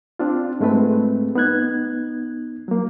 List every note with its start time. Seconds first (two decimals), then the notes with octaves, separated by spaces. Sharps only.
0.19 C4 D4 F4
0.60 G#2 G#3 A3 C4 B4
1.35 B3 D#4 F#6 G#6
2.68 F#3 A#3